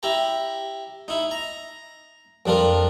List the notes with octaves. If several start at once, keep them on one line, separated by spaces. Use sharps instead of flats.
E4 G4 A#5
D#4 E4
A#5
F2 G3 D4 F4 A#4